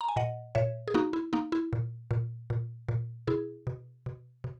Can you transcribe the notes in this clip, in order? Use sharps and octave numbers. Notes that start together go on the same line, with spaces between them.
A#5
G#5
A#2 D#5 F#5
A#2 C#5 E5
G#4
A#3 D#4 F#4
E4
A#3 D#4
E4
A#2
A#2
A#2
A#2
B2 E4 G#4
B2
B2
B2